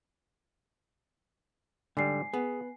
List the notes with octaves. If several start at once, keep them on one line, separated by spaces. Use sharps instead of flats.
G#2 D3 G3 G#5 C7
B3 G#4